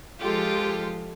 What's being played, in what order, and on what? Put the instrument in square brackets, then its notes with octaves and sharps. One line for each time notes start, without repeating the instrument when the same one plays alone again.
[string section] F3 G#3 F4 [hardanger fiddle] G4 A4